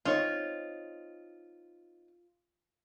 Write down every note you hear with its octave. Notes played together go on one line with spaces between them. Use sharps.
C4 D#4 F4 C#5